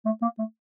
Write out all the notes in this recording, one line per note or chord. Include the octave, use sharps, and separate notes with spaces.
A3
A#3
A3